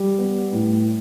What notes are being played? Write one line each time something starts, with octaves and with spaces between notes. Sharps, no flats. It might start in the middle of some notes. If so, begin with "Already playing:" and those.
Already playing: G3
B3
A2